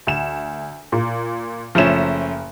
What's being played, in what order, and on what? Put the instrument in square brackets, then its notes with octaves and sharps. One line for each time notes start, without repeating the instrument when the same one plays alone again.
[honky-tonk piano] D2 E7
A#2
[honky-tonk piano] F#1 E7 [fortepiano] F3 A3 C#4